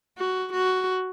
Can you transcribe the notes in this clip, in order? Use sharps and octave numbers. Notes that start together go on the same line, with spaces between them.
F#4
F#4